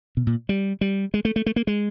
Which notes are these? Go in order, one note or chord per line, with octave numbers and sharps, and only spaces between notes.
B2
A#2
G3
G3
G#3
A3
A3
A3
A#3
G#3